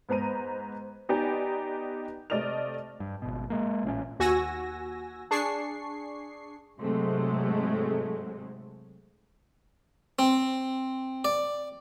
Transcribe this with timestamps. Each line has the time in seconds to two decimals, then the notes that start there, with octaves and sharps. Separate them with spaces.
0.09 G#2 B3 C5 A#5 D#7
1.09 B3 D#4 G4 D5 D#5 G#5
2.30 C3 A3 D5 D#5 F6 F7
3.00 G2
3.22 G#1 B2
3.50 G#3 A#3
3.84 A1 A#2 C4 C#4
4.19 D#2 F#4 G#5 E6 A#6
5.31 D4 G#4 C#6 C7
6.79 G#2 C3 F#3 G#3 A3
10.19 C4
11.25 D5